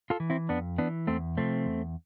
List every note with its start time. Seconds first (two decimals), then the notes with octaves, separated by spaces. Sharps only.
0.10 F4 A4
0.20 E3
0.30 C4 E4
0.49 F2 B3 D4
0.78 E3 B3 D4
1.07 E2 A3 C4
1.37 C3 F3 A3 C4
1.66 E2